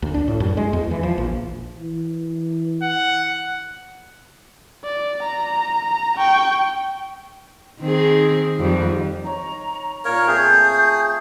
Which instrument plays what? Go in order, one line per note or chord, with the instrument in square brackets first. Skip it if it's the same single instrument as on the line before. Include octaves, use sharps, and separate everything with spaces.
[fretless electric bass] D2
D4
A2
F#2
G#3
E2
E3
F3
A#1
[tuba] E3
[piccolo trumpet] F#5
[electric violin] D5
A#5
G5 C#6
[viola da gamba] D#3 C4 G#4
F2 D#3 G3
[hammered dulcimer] D#4 C#5 [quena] A#5
[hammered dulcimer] A#2 F5 [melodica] A#4 C#5
[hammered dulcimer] A3 C4 A4 [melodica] G#4 [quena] G6